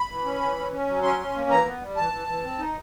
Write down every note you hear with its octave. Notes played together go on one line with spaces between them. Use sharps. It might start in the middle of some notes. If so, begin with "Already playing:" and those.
Already playing: B5
E3
C#4
E3
C#4
C#4
F#3
C#4 C6
C#4
A#3
E3 A#5
B3
G3
E3 A5
E3
E3
C4
D#4